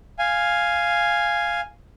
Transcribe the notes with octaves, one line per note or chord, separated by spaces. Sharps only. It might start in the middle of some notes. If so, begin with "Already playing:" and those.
F5 G#5